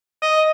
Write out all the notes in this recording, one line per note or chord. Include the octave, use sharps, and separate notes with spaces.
D#5